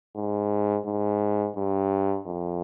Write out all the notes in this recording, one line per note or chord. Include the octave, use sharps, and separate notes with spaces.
G#2
G#2
G2
F2